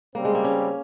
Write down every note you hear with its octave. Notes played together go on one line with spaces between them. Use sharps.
C#3 G3 A#3 C4
G#3
A#3
C#4